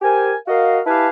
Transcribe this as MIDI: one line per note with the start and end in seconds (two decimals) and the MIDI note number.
0.02 0.33 67
0.02 0.33 70
0.02 0.33 72
0.02 0.33 80
0.47 0.79 66
0.47 0.79 70
0.47 0.79 75
0.47 0.79 77
0.86 1.09 64
0.86 1.09 67
0.86 1.09 71
0.86 1.09 77
0.86 1.09 80
0.86 1.09 81